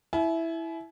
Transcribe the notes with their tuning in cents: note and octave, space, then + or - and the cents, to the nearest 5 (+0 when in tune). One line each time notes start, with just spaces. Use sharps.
E4 +0 G#5 +45